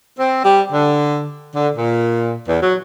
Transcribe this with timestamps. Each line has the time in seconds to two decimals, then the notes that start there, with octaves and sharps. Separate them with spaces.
0.19 C4
0.45 G3
0.72 D3
1.55 D3
1.76 A#2
2.47 E2
2.62 F#3